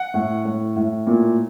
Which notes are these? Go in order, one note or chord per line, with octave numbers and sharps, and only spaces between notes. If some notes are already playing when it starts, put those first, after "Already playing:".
Already playing: F#5
A2
A2
A2
A#2